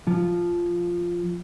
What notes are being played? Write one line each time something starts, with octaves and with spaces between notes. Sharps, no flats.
F3